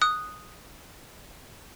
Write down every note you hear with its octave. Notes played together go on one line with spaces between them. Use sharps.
D#6 F#6